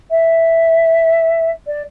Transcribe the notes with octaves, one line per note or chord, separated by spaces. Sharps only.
E5
D5